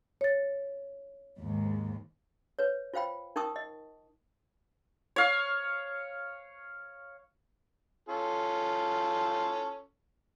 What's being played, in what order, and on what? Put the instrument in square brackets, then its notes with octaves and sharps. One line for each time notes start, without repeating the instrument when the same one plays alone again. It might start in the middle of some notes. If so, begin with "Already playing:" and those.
[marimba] C#5 A6
[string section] D#2 G#2
[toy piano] B4 C#5
F4 C5 F5 G5 B5
D#4 A#4 G5 A5 C#6 D#6
D#5
[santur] C#5 F5
[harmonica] C#4 F4 A4